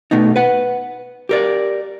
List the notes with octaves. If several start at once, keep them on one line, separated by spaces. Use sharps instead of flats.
B2 A3 B3 D#4
B4 F#5
G4 A#4 D5